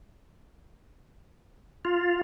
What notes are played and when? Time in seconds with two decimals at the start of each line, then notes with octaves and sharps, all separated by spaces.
1.85 F4